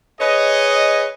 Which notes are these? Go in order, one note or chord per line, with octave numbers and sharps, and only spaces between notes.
G#4 B4 C#5 D#5